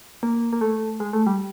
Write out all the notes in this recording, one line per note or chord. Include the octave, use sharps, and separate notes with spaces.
A#3
A#3
A3
G#3
A3
G3